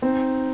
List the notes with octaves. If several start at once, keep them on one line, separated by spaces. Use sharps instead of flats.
C4 D#4